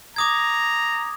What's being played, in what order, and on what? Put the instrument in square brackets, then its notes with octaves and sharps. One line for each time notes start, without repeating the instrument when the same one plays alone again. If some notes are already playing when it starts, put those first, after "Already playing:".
[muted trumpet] A#5 [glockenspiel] D6 D#6 G#6